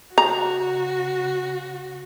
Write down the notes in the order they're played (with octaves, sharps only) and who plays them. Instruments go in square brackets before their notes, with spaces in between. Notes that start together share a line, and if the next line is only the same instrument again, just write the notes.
[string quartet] C#3 F#4 [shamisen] A#5